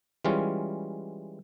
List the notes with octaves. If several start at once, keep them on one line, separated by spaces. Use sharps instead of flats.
E3 G3 G#3 C#4 F4